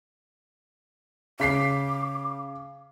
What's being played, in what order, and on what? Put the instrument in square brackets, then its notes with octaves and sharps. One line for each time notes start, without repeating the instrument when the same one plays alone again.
[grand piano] C#3 B6 C7 [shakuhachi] D6